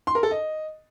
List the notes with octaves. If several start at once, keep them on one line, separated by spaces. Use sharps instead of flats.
C6
A#4
A4
D#5